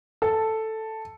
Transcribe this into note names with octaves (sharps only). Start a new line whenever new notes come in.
A4